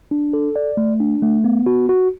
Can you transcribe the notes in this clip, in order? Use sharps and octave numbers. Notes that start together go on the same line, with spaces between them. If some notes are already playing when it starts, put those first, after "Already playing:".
D4
A4
D5
A3
D4
A3
B3
F#4
F#4